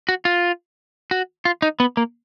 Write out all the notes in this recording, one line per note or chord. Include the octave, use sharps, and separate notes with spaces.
F#4
F4
F#4
F4
D#4
B3
A#3